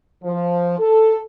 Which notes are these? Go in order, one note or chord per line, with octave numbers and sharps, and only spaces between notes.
F3
A4